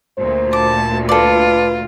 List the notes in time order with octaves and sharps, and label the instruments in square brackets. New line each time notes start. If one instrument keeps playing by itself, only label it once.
[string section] D2 A#2 [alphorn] C5
[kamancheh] A5 [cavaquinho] D6
[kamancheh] F4 [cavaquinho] A4 D5 [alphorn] B4